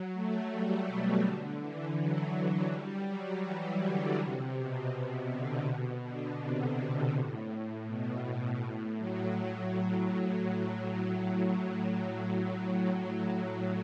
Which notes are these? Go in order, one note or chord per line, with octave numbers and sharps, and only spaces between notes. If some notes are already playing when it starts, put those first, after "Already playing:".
Already playing: F#3
A3
G3
B2
D3
E3
F#3
F#3
G3
F#3
E3
D3
C3
B2
C3
D3
B2
D3
C3
B2
A2
B2
A2
A2
F#3